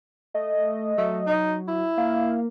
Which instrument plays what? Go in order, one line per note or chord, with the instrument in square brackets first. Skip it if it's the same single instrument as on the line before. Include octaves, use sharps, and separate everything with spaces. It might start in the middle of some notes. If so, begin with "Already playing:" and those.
[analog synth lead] A3 [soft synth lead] D#5
[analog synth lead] F#3 [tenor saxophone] A3
[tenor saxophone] D#4
E4
[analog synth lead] A#3 [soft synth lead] F5